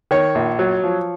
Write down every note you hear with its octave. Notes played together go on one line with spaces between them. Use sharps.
D#3 C#5
A#1
F#3
F3